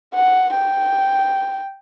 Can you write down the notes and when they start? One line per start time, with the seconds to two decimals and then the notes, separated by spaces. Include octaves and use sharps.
0.14 F#5
0.54 G5